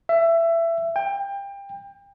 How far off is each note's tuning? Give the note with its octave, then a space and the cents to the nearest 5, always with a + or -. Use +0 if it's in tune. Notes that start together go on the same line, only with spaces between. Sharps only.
E5 +20
G5 +25